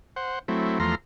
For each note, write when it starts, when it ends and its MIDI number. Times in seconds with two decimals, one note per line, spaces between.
0.16 0.39 72
0.16 0.39 78
0.48 0.79 54
0.48 0.79 57
0.48 0.79 60
0.48 0.79 64
0.80 0.95 40
0.80 0.95 53
0.80 0.95 57
0.80 0.95 82
0.80 0.95 84
0.80 0.95 89